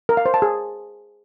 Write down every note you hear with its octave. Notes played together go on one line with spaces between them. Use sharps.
A#4
F5
C5
A5
G#4